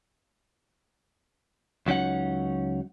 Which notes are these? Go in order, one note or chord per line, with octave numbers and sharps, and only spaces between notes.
C#2 F#3 C#4 D#4 F#5